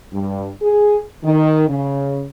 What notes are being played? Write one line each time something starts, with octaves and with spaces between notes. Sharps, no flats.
G2
G#4
D#3
C#3